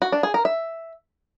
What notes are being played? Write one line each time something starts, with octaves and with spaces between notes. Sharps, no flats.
F#4
D4
G#4
A#4
E5